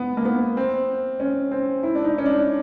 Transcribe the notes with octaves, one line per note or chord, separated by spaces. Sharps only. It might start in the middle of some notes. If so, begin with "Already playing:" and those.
Already playing: B3
A#3
B3
C4
C#4
C4
E4
D4
D#4
C#4
D4